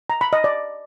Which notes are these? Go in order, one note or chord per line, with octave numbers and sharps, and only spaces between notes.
A#5
B5
D#5
D5